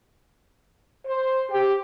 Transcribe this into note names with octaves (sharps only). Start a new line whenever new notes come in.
C5
G4